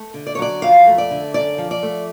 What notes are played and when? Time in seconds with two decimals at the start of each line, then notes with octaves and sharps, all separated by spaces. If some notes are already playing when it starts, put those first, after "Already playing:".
Already playing: A3
0.14 D3
0.27 D5
0.35 C#5
0.39 F#3 D5
0.62 F2 F5
0.87 A3
0.98 D5
1.11 D3
1.34 F#2 D5
1.58 F3
1.71 D5
1.83 A3